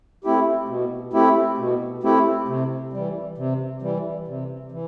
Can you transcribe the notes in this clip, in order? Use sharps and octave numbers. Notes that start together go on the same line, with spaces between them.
A3 C4 E4 G4
B2
A3 C4 E4 G4
B2
A3 C4 E4 G4
C3
E3 G3
C3
E3 G3
C3
E3